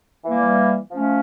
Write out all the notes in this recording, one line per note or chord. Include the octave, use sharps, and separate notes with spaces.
E3 G3 A#3
F3 A3 C#4